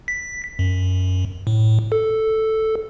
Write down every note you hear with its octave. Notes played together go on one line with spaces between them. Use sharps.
B6
F#2
A2
A4